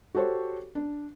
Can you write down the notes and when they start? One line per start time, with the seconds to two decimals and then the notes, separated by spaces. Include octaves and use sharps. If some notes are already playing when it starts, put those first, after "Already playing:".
0.15 F#4 G4 A4 C5 C#5
0.75 D4